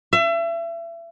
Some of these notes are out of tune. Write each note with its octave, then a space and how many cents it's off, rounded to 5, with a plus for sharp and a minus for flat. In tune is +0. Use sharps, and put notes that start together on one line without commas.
E5 +35